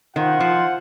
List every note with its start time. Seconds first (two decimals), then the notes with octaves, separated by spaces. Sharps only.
0.16 D#3 F4 C5 F#5
0.40 F3